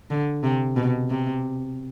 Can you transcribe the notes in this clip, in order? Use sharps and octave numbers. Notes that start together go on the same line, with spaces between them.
D3
C3
B2
C3